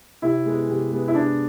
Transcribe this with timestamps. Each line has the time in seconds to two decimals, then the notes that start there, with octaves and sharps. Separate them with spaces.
0.22 C3 E4
0.46 G#3 B3
0.69 C3
0.92 G#3 B3
1.08 E4
1.15 C3 D4